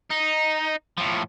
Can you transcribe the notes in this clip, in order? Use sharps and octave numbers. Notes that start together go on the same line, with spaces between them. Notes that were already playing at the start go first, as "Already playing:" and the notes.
D#4
A2 F3